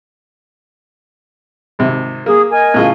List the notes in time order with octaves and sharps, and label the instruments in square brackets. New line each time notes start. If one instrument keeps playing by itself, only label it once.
[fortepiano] G#1 C3
[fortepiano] A#3 [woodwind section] G#4
[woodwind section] A#4 D#5 G#5
[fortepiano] A2 C#3 F4